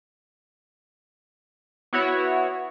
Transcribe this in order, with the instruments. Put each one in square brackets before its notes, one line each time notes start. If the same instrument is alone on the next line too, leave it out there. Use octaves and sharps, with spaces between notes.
[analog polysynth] B3 E4 F#4 C#5